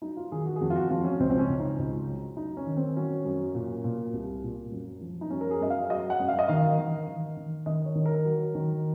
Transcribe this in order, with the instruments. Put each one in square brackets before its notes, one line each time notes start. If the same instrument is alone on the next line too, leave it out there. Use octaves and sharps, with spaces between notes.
[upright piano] F#3 D#4
F4
D#3 G#4
F#4
G#4
F2 F#4
F4
F#4
F2 F4
C#4
C#2 C4
C4
C#4
C#2
D#4
C#2
F#3
F#3 D#4
C#4
D#3
C4
F#3 C#4
F#2
A#2
A#2
C2
A#2
F#2
F3
D#4
F#2 C#4
A#4
G#4
F#2 D#5
F5
F#3 D#5
F#5
F#2
F5
D#5
D#3 F5
D#3
D#3
D#3
D#3 D#5
C#5
D#3
A#4
F#3
D#3